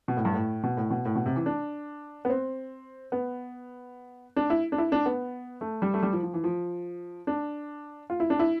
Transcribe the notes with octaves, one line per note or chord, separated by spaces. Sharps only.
B2
A2
G2
A2
B2
A2
B2
A2
B2
C3
E3
D4
B3
C4
B3
D4
E4
D4
E4
D4
B3
A3
G3
A3
G3
F3
F3
E3
F3
D4
F4
E4
D4
E4